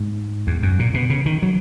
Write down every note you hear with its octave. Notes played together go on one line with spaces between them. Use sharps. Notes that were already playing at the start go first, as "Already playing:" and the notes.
Already playing: G#2
E2
F#2
A#2
B2
C#3
D#3
F#3